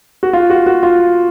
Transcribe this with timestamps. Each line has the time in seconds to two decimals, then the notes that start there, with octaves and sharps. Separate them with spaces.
0.23 F#4
0.33 F4
0.50 F#4
0.66 F#4
0.83 F4